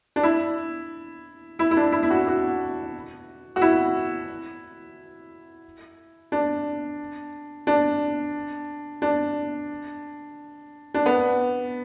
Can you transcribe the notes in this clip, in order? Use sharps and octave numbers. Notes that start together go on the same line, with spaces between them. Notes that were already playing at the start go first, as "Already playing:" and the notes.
D4
E4
E4
E4
D4
E4
E4
F#4
F#4
F#4
E4
D4
D4
D4
D4
B3